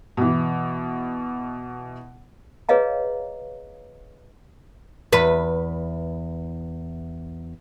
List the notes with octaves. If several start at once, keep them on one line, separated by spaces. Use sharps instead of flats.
B2 E3
G#4 B4 C#5 D#5 F5 A#5
E2 B4